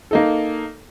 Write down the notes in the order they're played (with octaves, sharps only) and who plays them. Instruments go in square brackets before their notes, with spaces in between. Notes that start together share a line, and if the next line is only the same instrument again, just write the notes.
[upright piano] A#3 D#4 A4